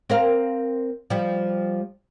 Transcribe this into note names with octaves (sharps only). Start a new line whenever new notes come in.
C4 A#4 F5
F3 G3